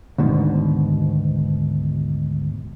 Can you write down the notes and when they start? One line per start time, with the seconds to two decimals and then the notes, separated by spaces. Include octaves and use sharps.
0.18 D2 G#2 B2 D#3